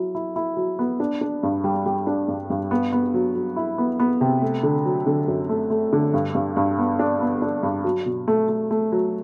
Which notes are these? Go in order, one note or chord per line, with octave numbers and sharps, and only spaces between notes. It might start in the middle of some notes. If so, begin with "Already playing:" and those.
Already playing: F#3 E4
E4
E4
F#3
B3
D4
D4
G2
G3
G3
D4
G2
G2
B3
B3
F#3
F#3
E4
B3
B3
C3
A3
D3
F#3
D3
F#2
A3
A3
D3
G2
G2
G2
B3
D4
B3
D4
G2
F#3
B2
A3
A3
A3
F#3